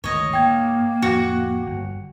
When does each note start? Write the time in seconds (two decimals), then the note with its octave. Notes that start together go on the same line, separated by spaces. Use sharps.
0.04 G#1 D2 G#2 C#5 D#5
0.33 G#2 A#3 G5 G#6
1.02 F2 A2 F3 F#4
1.66 G1